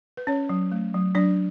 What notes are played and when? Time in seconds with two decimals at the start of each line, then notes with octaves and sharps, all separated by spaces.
0.17 B4
0.27 C#4 C#5
0.49 F#3
0.72 A3
0.94 F#3
1.15 F#3 D4 D5